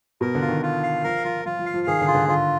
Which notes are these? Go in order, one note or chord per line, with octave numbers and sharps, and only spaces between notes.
B2 A#4
D3
F4
D#3
F4
F5
F3 A#4
F3 F4
F3 F4
F3
F5
F3
D#3 G#4
D3
F4
D3
D3 F4